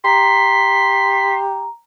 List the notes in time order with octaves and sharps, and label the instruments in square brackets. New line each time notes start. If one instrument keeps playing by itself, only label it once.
[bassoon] G4 [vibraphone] A#5 [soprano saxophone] C6 [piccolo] B6